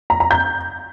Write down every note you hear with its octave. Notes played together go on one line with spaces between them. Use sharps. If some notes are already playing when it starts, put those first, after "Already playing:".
A#5
A#5
G6